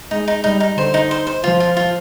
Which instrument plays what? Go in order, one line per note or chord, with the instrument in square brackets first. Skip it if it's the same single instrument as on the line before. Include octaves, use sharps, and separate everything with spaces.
[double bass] G#3 [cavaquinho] D#4
[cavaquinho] D#4
[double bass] G3 [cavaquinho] D#4
[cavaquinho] D#4
[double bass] D3 [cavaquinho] C5
[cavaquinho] D#4
C5
C5
[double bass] F3 [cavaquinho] F4
[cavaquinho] F4
F4